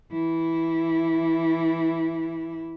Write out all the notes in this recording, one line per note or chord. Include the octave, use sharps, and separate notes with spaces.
E3 E4